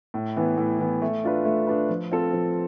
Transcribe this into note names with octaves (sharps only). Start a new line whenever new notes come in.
A2
E3 B3
A2
E3 B3
A3
D4 F4 B4
A3
D4 F4 B4
F3
C4 F4 A4
F3